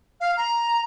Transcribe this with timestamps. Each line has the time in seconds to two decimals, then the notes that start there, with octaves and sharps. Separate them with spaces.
0.20 F5
0.37 A#5